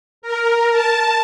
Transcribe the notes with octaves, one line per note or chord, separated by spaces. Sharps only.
A#4
A5